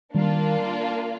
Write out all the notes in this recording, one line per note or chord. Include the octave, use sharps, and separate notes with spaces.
D#3 G3 A#3 D4 F4